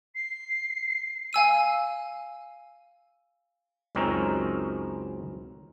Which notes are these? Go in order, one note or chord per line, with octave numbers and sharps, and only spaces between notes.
C7
F5 G#5 E6 D#7
C#2 F#2 C4 C#4 D#4 A#4